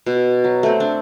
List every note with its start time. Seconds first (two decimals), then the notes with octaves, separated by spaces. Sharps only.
0.06 B2
0.44 F#3
0.63 A3 C4
0.80 D4